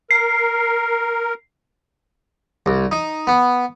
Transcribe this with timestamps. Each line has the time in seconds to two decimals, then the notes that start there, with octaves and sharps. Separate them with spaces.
0.11 A#4 C7
2.66 C2
2.92 D#4
3.27 B3